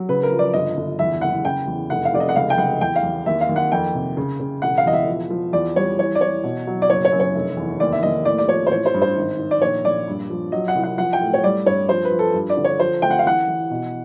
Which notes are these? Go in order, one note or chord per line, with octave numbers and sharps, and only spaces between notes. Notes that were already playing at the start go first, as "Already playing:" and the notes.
Already playing: F#3
C#3 B4
A#4
F3
D5
G1 D#5
G1
E2 E5
F#1 F#5
C#3 G5
E2
F1 F#5
F5
F1 D5
D#5
F#5
C#2 F5
G5
C#2 F#5
E2 G5
F5
E2
D#2 E5
F5
D#2
F#5
F2 G5
C3
C#3
C#3
E1 F#5
F5
E2 D#5
E5
F3
F3
E2 D5
G3 C#5
E3 C#5
D5
E3 C#5
B2
F#3
D5
F#1 C#5
C#5
F#2
C#5
F1
E2
D#2 D5
E5
D#2 D#5
A2 D5
D5
F3 C#5
C5
A1 C#5
C5
G2
C5
G#1
D#3
D5
A#1 C#5
A#1 D5
G2
F3
F#3 D#5
F#5
C2
F#5
F3 F#5
G5
A2
C#5
G3 D5
G2 C#5
F3 C5
B4
F3
A4
G2
D5
D3
C#5
F3 C5
D2 G5
F#5
F5
E3 F#5
E3
B2